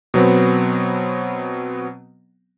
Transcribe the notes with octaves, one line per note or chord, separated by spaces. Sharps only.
B2 F#3 B3 C4